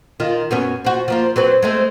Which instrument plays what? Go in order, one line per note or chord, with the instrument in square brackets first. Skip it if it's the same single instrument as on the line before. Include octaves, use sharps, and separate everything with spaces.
[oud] D#3 F4
F#2 B3 C#4
F3 F#4
F3 A#3 F4
F#3 C4 B4
G#3 A3 C4